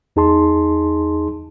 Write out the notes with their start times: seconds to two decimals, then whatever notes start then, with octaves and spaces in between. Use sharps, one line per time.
0.16 E2 D#4 G#4 A5 C6